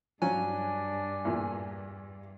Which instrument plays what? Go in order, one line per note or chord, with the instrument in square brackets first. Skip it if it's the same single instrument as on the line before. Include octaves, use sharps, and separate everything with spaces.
[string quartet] G2 [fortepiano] F#3 C#4 F4 [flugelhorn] D4 [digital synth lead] G#5
[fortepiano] E2 A#2